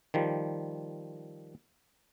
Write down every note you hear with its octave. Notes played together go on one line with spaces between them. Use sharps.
D#3 F3 G3